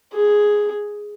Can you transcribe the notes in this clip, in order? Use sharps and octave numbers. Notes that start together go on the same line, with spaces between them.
G#4